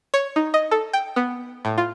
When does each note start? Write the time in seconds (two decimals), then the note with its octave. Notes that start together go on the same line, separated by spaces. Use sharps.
0.14 C#5
0.36 D#4
0.54 D#5
0.71 A4
0.93 G5
1.16 B3
1.65 A2
1.78 F4